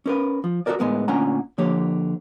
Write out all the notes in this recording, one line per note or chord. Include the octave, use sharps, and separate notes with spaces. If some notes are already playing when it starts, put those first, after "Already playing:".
C#4 A#4 B4
F3
F#4 G4 A4 A#4 D5
A2 G#3 B3 A#4
D2 A#2 C#4 D4 F#5 A#5
D3 F3 A#3 G4 C#5